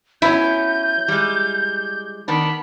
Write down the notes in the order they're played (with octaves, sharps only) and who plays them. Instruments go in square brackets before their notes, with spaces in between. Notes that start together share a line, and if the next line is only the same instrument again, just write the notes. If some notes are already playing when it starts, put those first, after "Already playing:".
[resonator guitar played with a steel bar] F#3 B3 C#4 [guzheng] E4 [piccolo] G6
[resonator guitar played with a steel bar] G3 G#3
[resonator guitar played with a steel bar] D#3 B3 D4 [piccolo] B5